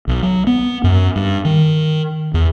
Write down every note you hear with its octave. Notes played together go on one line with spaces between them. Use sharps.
B1
F#3
B3
F#2
G2
D#3
E2